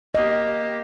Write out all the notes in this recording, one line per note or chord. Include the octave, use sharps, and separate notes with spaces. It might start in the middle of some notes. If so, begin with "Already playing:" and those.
A#3 G4 D#5